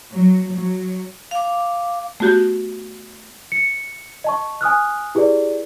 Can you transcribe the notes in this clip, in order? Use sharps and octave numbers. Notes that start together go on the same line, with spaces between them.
F#3
F#3
F5 D6
A3 B3 F#4 G4
C#7
D#5 A5 C#6
G#5 D#6 F6 F#6
E4 G4 G#4 B4 D5